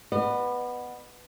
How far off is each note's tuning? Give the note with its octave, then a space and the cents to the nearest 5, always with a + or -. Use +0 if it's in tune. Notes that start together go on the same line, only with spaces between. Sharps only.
B3 +0 D#5 -45